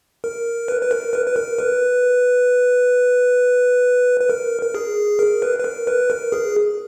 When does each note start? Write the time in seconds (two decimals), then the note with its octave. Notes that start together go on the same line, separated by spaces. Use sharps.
0.24 A#4
0.68 B4
0.81 B4
0.91 A#4
1.13 B4
1.26 B4
1.36 A#4
1.59 B4
4.21 B4
4.30 A#4
4.63 A#4
4.75 G#4
5.19 A#4
5.42 B4
5.59 B4
5.64 A#4
5.87 B4
6.10 A#4
6.32 G#4